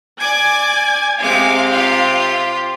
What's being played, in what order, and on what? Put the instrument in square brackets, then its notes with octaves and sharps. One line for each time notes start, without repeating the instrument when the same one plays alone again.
[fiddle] D5 D6 [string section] G#5 G#6
[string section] C3 F5 [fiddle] G#3 D6
[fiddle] F4 G4